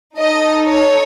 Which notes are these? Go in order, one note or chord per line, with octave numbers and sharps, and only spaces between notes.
D#4 A4 D#5
C#5